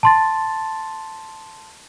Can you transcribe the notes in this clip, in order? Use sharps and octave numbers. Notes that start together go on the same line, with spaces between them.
A5 C6 A6